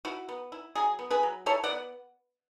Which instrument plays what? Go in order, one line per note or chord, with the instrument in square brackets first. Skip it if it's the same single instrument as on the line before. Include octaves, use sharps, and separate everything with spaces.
[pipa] E4 F#4
B3
E4
F#3 G#4
B3
G#4 B4
F#3
E4 A4 C#5
D5 F#5
B3